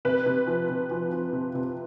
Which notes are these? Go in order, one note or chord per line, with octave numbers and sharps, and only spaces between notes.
C3 B4
C3
F3
C3
F3
F3
C3
C3